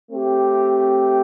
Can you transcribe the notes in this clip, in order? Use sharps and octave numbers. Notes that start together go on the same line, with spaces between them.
A3 C4 G4